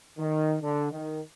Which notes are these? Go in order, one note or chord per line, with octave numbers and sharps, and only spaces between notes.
D#3
D3
D#3